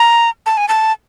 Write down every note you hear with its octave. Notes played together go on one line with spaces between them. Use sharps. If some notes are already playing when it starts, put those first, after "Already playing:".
Already playing: A#5
A5
G#5
A5